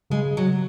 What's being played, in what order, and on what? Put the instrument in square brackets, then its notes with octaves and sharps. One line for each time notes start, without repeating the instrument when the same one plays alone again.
[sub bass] C#3 [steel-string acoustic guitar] G#3
[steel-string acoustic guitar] F#3